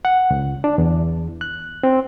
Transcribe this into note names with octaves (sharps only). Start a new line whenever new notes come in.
F#5
C#2
D4
E2
F#6
C4